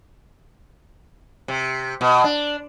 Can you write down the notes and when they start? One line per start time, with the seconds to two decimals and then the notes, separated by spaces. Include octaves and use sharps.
1.48 C3
2.01 B2
2.24 D4